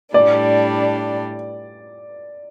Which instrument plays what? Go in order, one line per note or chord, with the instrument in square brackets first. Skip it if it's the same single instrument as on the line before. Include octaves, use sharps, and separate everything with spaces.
[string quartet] A2 G3 D4 [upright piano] D5